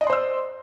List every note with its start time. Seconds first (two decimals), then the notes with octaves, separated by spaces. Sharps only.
0.01 D#5
0.04 D5
0.07 C6
0.10 C5
0.13 E6